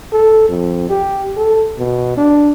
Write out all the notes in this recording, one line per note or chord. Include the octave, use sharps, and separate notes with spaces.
A4
F2
G4
A4
B2
D4